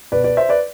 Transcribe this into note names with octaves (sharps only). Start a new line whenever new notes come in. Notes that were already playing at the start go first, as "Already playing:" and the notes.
B2 B3 B4 D5
B4 D5
C5 E5
B4 D5